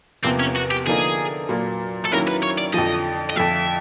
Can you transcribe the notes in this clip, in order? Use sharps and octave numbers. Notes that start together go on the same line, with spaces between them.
E2 C3 F3 A#3 C4
C#4
F#4
G4
D3 F3 A#3 D#4 G#4
A#2 F#3 A#3
A4
D#3 F#3 A#3 C#4 E4 A#4
B4
C#5
D5
F2 D3 F3 D#5
D#5
F2 D3 F3 A3 E5